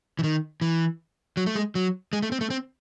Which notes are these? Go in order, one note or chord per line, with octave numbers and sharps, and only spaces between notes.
E3
D#3
E3
F#3
A3
G#3
F#3
G#3
A3
C4
A3
C4